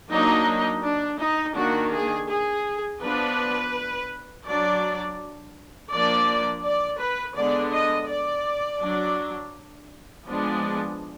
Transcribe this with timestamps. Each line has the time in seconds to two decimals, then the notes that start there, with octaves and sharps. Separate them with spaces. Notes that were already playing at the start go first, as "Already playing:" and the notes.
0.10 F#3 A#3 D4 D#4
0.83 D4
1.20 D#4
1.55 D#3 A#3 D4 F#4
1.92 G#4
2.28 G#4
3.01 F3 B3 D4 B4
4.45 F#3 D4 D5
5.91 F3 A#3 D4 D5
6.63 D5
7.00 B4
7.35 D3 G#3 B3 D4 D5
7.72 D#5
8.08 D5
8.80 F#3 D4
10.26 F3 G#3 B3 D4